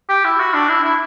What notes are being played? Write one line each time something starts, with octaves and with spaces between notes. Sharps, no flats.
G4
E4
F#4
D4
E4
E4